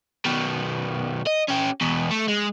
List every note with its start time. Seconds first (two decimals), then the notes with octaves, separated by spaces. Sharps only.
0.25 B2 D#3
1.27 D#5
1.49 C#4 G4
1.81 E2 B2
2.11 A3
2.28 G#3